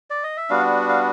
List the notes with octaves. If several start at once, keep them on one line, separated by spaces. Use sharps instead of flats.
D5
D#5
E5
G3 B3 D4 F#4 F5
F5